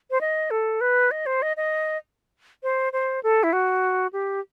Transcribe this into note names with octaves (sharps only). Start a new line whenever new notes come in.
C5
D#5
A4
B4
D#5
C5
D#5
D#5
C5
C5
A4
E4
F#4
G4